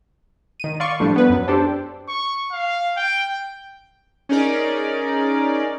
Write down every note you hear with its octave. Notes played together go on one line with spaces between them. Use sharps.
D#3 D#7
D5 F5 C6 C#6
A2 F3 G3 D4
B3 B4
F#2
D4 G4 A4 C5
C#6
F5
G5
C#4 D#4 G#4 A#4 D5